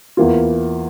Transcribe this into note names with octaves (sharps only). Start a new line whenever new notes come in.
E2 E3 A#3 F4